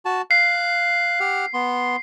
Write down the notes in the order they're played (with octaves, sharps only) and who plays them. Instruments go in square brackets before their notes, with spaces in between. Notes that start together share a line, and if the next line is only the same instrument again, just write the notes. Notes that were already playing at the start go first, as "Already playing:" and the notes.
[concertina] F#4 A5
[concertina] F5 F#6 [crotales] C7
[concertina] G4 F#5 F6
B3 C6